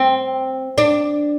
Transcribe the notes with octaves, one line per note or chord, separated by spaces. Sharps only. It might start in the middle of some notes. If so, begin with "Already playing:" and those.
Already playing: C4
D4